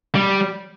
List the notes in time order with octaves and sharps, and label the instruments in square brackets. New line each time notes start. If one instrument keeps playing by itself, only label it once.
[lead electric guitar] G3